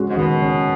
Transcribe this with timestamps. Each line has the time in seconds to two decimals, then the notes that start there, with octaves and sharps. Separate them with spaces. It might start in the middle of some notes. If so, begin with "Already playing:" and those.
Already playing: G#3 C#4 F#4
0.09 G#2
0.17 B2 D#3
0.42 C#4